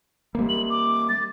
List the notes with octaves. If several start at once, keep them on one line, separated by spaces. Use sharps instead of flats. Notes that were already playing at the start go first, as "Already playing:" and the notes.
G3 A#3
F#7
D6
A6